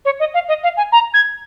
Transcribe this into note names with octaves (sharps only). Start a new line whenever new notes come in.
C#5
D#5
F5
D#5
F5
G#5
A#5
G#6